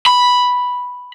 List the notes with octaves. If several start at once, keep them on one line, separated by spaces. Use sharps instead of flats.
B5